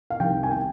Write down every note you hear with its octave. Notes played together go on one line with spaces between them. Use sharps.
F5
C2 C3 D#3 G3 G5
G#5
G5